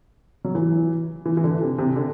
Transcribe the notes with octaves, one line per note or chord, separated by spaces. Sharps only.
F#3
E3
E3
E3
D3
C3
C3
D3